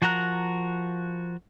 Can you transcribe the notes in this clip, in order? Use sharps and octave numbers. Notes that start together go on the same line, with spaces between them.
F3 F#4 A#4 A#5 F#6